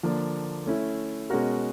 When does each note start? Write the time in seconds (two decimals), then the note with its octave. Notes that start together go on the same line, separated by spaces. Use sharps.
0.03 D3 F3 A#3 D4
0.66 A3 C#4 E4
1.30 B2 G#3 C#4 F#4 A#4